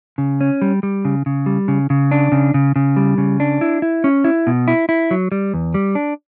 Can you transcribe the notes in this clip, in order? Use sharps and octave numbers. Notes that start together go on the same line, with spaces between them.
C#3
C#4
G3
G3
C#3
C#3
G3
C#3
C#3
D4
C#3
C#3
C#3
G3
C#3
D4
E4
E4
C#4
E4
B2
E4
E4
F#3
G3
E2
G3
D4